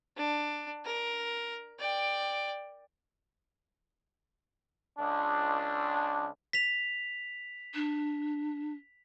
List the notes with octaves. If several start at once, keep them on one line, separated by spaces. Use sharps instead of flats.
D4
A#4
D5 G5
C#2 D4
B6 F7
D4